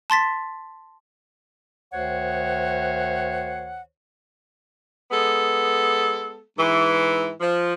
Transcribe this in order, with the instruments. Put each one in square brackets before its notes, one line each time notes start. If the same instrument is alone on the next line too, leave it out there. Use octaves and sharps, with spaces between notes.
[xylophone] A5 C6 A6 B6
[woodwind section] D2 D#3 C5 C#5 F#5
[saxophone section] G#3 B3 A4
G#2 E3
F3